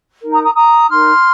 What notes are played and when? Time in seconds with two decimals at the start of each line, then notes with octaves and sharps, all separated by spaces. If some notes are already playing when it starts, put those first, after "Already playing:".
0.21 D#4 A#4
0.32 A#5 D#6
0.44 A#5 D#6
0.54 A#5 D#6
0.88 D#4 A#4 C6 F6